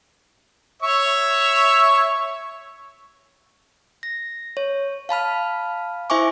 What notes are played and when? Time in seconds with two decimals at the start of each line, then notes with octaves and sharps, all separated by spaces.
0.82 C#5 E5 C#6
4.03 A#6
4.57 C#5
5.09 F5 A5 B5 F6
6.10 E4 C5 E5 G#5 C#6 D6